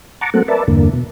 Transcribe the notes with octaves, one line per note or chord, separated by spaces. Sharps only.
F#5 A5 A#5 C#6 D6
F#3 A3 A#3 C4 A4 F#5
A#4 B4 D5 E5 A5
E2 G2 D3 A#3
B2